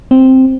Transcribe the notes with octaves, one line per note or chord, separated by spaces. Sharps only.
C4